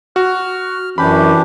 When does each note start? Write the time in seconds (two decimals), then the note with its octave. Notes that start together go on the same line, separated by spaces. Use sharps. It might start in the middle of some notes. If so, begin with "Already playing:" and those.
0.16 F#4 F6
0.98 F#2 E3 C#4 D4 G4 B5